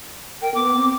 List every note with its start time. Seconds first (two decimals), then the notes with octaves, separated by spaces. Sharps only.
0.42 A#4 G5
0.55 B3 D6
0.77 C4